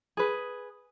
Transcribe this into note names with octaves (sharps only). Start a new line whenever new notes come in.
G#4 B4